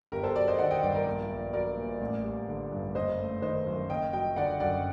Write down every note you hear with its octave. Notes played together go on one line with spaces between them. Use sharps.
G1 G4 A#4
A4 C5
F#3 A#4 D5
C5 D#5
D#3 D5 F#5
D#5 G5
G2 D5 F#5
A#4 D5
A#1
A#1
F#3 A#4 D5
A#2
A1
G3
D3
G2
F#1 C5 D#5
A3
D#3 C5 D#5
F#2
F#1 D#5 G5
F#3 D#5 G5
D3 D5 F#5
F#2 D5 F#5